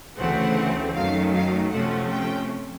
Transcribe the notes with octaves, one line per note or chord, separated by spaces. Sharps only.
D2 C#3 E3 A3 C4 F#5
F#2 D#3 F#3 A3 F5
F5
C3 F3 A3 C#4 F#5
G5